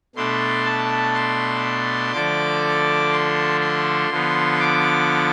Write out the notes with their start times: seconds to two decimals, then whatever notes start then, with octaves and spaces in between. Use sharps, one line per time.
0.16 B2 A3 D4 C6
0.65 A5
1.15 C6
2.13 D3 F3 A3 D4 D6
3.11 C6
3.61 C6
4.10 D3 F3 B3
4.60 D6